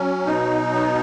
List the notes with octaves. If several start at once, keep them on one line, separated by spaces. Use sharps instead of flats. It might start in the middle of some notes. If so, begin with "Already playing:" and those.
Already playing: F#3 C#4
B2 D#4
B3